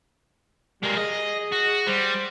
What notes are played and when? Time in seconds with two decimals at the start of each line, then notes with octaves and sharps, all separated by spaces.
0.83 G3 G#3 A#3
0.97 G#4 D#5
1.52 F#4
1.87 G3 C5